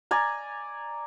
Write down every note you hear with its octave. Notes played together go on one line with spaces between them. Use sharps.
D5 G#5 A#5